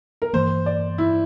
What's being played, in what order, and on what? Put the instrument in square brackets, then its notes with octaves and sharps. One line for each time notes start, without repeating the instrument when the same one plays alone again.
[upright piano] A#4
[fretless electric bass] G2 E3 A#3 [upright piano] C5
[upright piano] D5
E4